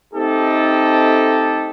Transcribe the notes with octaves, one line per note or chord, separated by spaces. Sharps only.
A3 C4 D#4 G4 A4 D#5